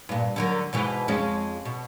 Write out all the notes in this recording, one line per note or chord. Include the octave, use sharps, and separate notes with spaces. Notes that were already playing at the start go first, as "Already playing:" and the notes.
G2 A#2
D3 F#3 A#4
G#2 B2 E3
F2 G#3 C#4
B2